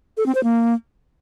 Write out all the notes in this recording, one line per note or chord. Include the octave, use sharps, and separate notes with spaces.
A4
C4
C5
A#3